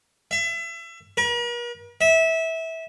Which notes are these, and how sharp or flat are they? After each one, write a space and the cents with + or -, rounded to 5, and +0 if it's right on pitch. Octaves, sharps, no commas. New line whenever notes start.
E5 +30
A#4 +45
E5 -20